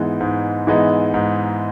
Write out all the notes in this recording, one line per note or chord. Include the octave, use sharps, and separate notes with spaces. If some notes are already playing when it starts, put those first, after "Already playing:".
Already playing: G#2 E3 G#3 B3 D#4
G#2
E3 G#3 B3 D#4
G#2